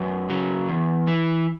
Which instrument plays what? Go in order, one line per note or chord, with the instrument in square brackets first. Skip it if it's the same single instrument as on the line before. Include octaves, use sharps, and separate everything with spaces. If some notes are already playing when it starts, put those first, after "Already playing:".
Already playing: [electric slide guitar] F#2 B4
C#3 F#3
E2
E3